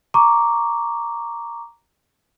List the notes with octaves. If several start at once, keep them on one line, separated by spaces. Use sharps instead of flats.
A#5 C#6 D6